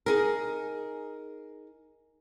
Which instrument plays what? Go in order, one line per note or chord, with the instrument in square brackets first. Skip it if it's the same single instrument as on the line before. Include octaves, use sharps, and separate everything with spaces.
[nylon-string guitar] D#4 G#4 A#4